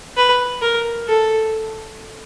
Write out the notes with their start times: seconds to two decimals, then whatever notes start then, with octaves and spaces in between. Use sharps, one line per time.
0.17 B4
0.62 A#4
1.08 A4